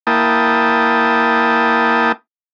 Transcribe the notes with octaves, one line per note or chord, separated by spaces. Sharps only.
A#3 E4 G5 A5 D#6